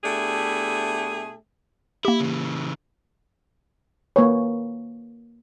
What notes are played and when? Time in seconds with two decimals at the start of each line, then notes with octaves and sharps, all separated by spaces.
0.04 B2 A3 D4 E4 G4 G#4
2.05 A#3 E4 G4
2.20 C#3 E3
4.16 A#3 B4 C#5